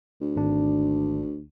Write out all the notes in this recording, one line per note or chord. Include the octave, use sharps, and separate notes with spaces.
D2
G#1 D4